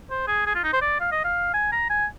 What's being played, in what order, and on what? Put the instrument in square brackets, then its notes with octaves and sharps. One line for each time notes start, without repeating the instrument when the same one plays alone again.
[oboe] C5
G#4
G#4
F4
D#4
C5
D5
F5
D#5
F5
G#5
A#5
G#5